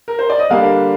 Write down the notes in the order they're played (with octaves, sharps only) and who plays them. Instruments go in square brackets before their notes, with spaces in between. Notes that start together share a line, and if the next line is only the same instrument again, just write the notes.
[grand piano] A#4
C5
D5
D#5
D3 G3 A#3 D4 F5